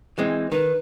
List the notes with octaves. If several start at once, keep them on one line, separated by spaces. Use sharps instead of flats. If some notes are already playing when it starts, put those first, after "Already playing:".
E3 G#3 C4
D#3 B4